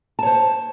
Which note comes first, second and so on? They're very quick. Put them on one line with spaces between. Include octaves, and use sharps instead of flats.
A5 C#5 C5